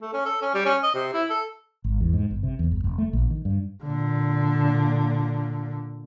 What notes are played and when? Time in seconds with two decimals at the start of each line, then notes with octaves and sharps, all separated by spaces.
0.02 A3
0.14 C#4
0.26 A4
0.42 C#4
0.54 G3
0.66 C#4
0.83 D#5
0.95 C3
1.14 E4
1.30 A4
1.84 G#1
2.00 E2
2.13 G#2
2.31 G1
2.43 C3
2.59 E2
2.71 G1
2.84 F1
2.98 A3
3.13 A#1
3.30 D#3
3.45 G2
3.84 A#2 D3